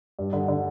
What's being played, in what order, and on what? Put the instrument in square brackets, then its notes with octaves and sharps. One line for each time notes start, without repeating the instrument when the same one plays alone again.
[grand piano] G2
D3
D3